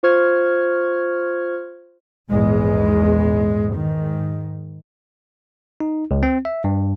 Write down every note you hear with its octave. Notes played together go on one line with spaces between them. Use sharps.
F4 C5 C#6 F6 G#6
A#1 E2 G#2 G#3
G#2 D#3
D#4
C#2
C4
E5
G2